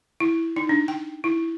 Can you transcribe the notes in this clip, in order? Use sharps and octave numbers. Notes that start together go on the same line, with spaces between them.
E4
D#4
D4
G5
E4